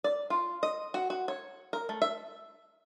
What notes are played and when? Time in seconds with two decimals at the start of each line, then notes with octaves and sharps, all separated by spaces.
0.04 D5
0.30 F4
0.63 D#5
0.94 F#4
1.10 F#4
1.28 C#5
1.73 A#4
1.89 A3
2.02 E5